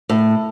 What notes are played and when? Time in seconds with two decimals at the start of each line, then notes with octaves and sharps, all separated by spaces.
0.09 A2